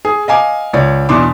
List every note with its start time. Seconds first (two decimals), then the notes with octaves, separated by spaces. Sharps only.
0.05 G#4
0.28 D#5 F5 G#5 D6
0.73 C#2 C#5 D5
1.09 E2 B2 D4 C6 D6